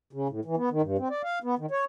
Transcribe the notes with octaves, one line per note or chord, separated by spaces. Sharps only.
C#3
A2
E3
B3
D#3
G2
C4
D5
F5
B3
D#3
C#5